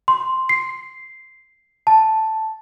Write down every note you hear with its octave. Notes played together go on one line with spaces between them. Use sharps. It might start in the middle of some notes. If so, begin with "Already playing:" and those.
C6
C7
A5